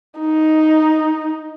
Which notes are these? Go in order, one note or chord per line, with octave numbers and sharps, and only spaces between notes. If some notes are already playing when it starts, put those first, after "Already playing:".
D#4